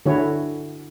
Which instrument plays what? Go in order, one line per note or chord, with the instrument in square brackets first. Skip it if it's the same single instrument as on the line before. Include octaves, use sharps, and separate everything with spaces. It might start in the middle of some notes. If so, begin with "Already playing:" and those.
[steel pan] D3 A3 E4 F#4 C#5